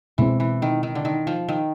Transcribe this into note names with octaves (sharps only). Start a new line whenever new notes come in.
B2 E3 G#3 C4
E3
D#3
D#3
D3
D#3
F3
D#3